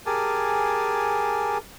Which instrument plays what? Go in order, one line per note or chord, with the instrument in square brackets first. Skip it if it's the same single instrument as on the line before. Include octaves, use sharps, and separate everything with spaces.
[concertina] G4 G#4 A#4 G#5 A5